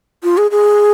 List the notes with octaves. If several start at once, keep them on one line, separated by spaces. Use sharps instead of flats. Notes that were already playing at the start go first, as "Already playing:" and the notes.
F4
G#4
G#4